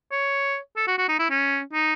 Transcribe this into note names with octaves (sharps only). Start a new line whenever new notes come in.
C#5
A4
F#4
F#4
D#4
E4
C#4
D#4